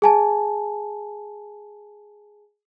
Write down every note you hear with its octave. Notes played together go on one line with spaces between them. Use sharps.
G#4 G#5 A5